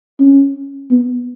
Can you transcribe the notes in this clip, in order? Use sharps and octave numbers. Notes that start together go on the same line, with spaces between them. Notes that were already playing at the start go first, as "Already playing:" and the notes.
C#4
B3